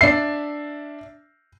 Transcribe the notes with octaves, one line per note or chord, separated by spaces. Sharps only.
D4 E5 C7